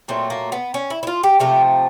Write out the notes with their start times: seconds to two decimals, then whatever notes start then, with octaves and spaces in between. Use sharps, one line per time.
0.08 A#2 F#3 A3 C4
0.30 A#3
0.52 B3
0.74 C#4
0.90 E4
1.03 E4
1.07 F4
1.23 G4
1.40 C3 F3 A3 G4